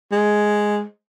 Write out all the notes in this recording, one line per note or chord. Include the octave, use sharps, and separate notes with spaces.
G#3